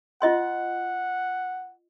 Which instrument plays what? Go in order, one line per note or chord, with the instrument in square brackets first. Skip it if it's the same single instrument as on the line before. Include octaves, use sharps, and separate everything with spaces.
[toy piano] F4 D#5 C6 [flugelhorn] F#5